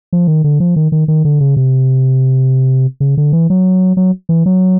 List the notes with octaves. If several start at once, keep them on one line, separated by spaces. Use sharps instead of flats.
F3
D#3
D3
F3
D#3
D#3
D#3
D3
C#3
C3
C#3
D3
E3
F#3
F#3
E3
F#3